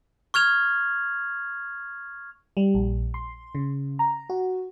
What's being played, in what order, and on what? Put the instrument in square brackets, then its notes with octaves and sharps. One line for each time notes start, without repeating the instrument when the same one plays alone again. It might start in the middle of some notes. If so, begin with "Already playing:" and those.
[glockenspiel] C#6 F6 G#6 F7
[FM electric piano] G3
A#1
C6
C#3
A#5
F#4